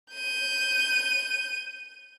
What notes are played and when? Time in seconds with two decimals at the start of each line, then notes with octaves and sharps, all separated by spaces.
0.14 G6 D#7